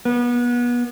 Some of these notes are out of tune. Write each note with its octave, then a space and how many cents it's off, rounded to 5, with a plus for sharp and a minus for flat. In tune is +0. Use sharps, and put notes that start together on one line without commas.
B3 -30